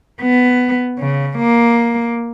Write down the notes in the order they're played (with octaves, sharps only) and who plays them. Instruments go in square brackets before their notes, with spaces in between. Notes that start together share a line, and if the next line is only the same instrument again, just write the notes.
[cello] B3
C#3
A#3